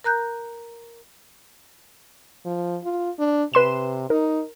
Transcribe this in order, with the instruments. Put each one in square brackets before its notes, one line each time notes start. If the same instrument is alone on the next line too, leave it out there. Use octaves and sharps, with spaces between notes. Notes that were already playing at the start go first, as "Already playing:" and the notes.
[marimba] A#4 A#5 F#6 G6
[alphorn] F3
F4
D4
[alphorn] C3 [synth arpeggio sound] B4 C6 E7
[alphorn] D#4 [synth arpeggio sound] A#4